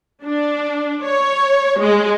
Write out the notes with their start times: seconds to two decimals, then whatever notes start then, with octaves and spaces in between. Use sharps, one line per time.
0.25 D4
1.04 C#5
1.80 G#3